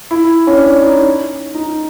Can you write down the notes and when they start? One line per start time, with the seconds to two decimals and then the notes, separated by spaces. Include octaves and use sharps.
0.11 E4
0.47 C#4
0.58 D4
0.82 D#4
1.54 D#4